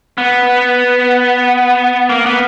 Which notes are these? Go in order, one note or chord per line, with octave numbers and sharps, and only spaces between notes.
B3
A#3
B3